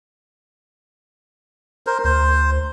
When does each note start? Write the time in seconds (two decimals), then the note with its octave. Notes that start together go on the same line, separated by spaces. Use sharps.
1.87 A#4 C5
2.04 D2 C5